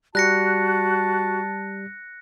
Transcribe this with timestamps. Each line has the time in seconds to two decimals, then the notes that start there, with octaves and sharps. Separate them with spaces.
0.15 G3 F#4 A5 F#6 A#6 C#7